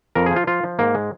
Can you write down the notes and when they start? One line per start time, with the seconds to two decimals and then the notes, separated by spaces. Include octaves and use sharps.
0.15 F2 A#4
0.26 F3 G#4
0.36 F4
0.47 F3 F4
0.64 F3
0.79 G#2 A#3
0.95 G#3